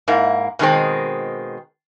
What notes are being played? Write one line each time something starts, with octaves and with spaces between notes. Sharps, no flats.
G#2 A#3 E4
B2 D#3 F#3 G#3 C4